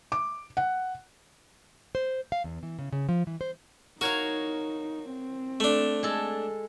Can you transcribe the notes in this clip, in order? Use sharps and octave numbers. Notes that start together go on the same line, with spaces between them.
D6
F#5
C5
F5
E2
E3
C#3
C#3
F3
E3
C5
D#4 F#4 A#4 C#5 F5
C4
A3 D4
G#3 A4